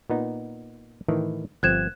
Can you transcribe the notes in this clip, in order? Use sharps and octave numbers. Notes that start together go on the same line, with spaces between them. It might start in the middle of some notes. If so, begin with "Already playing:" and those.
A#2 B3 D#4
A2 D#3 E3
G1 F3 C4 F#6 G#6 E7